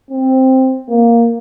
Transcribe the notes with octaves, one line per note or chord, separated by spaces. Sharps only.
C4
A#3